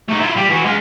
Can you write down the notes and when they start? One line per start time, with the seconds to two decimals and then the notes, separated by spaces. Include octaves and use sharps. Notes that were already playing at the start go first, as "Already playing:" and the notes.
0.08 A3 D#4
0.20 E4 F4
0.36 G3
0.49 E3 F#4
0.65 G#3 F5